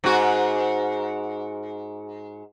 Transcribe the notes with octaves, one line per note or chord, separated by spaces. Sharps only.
G#2 F#4